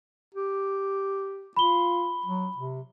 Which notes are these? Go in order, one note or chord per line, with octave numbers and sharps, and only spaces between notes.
G4
F4 B5 G7
F#3
C3